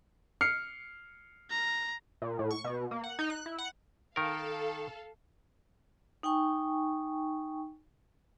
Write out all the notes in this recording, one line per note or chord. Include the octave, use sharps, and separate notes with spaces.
F6 C7 C#7
A#5
A#2
A2
C#6
B2
A#3
F#5
D#4
F#6
E4
F#5
D#3 A4 A#4 F5
D#4 G5 G#5 C#6